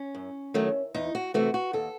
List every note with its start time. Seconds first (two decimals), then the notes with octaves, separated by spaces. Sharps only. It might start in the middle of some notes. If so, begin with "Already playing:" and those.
Already playing: C#4
0.15 F#2
0.54 D#3 F#3 A3
0.94 E2 D#4
1.15 F#4
1.34 C3 E3 A3 F#4
1.54 F#4
1.73 D#2 A4